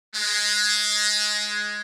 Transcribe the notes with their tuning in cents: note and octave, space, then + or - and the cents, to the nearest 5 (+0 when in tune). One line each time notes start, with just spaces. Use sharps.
G#3 +10